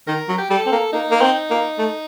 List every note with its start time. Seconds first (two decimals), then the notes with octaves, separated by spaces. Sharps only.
0.07 D#3 A#4
0.29 F#3
0.38 G4
0.50 G3 A4
0.66 C4
0.72 A#3
0.93 A#3 D#4
1.11 A#3
1.22 C4
1.50 A#3
1.78 A3